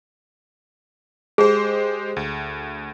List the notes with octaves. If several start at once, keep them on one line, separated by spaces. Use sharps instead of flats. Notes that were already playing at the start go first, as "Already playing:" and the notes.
G#3 G4 G#4 C5
D2